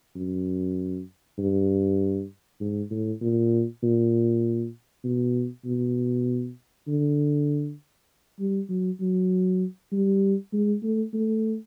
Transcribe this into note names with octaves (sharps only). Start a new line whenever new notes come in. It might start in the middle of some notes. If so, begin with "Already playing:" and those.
F#2
G2
G#2
A2
A#2
A#2
B2
B2
D3
G3
F#3
F#3
G3
G#3
A3
A3